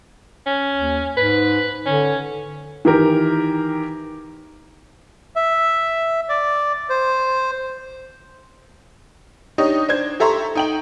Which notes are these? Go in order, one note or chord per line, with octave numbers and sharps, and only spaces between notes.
C#4
D#2
G#2 B4
D3 C#4
D#3 E3 G4 A#4
E5
D5
C5
D4 D#4 G4 C#5 D#5
D4 C5 G#6
G4 A4 E5 A#5 C6 C#6
D#4 G5 F#7